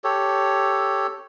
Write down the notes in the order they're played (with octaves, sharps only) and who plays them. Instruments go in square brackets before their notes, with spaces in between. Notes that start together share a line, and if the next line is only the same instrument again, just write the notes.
[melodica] G4 A4 C#5